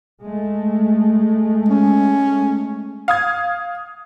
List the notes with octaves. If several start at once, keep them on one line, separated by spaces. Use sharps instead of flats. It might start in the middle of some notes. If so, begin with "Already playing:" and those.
G#3 A3
C#4
F5 D#6 G#6